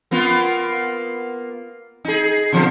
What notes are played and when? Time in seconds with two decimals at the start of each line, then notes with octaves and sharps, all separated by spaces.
0.11 A#3 B3 F4
2.05 D#4 G#4
2.52 B2 D3 F3